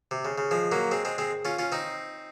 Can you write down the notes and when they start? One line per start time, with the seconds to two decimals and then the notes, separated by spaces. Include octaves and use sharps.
0.11 C3
0.25 C#3
0.38 C#3
0.51 F3 G#3
0.72 F#3 A#3
0.91 G#3 C4
1.05 G#3 C4
1.18 G#3 C4
1.45 C#4 F4
1.59 C#4 F4
1.72 C4 D#4